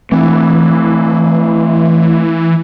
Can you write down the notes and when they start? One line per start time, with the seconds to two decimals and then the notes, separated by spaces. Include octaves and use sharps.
0.12 E3 A3 C4